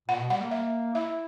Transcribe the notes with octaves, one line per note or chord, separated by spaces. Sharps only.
A#2 F#5
B2
G3 F#5
A#3
E5
E4 E5